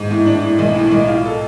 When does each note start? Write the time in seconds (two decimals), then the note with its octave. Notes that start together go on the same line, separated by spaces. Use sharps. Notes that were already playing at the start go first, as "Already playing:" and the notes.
Already playing: G#2
0.11 A2
0.26 D4
0.43 A2
0.59 B1
0.76 A2
0.92 B1
1.08 F4
1.25 A4